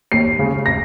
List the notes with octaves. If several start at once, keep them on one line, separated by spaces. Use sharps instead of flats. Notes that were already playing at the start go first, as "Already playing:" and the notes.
D#2 C7
C#3 G#3
A#6